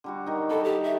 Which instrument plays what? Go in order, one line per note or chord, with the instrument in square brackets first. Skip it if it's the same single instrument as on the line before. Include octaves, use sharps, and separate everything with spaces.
[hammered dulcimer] D3 G3 F#4
D#3 D#4
[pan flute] A4 [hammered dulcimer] D#5 A5 B5
[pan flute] G4
E5